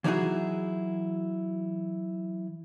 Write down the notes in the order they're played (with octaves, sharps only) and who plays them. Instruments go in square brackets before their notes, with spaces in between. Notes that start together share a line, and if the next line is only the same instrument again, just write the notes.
[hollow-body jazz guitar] E3 F#3 D#4 E4 F#4 G#4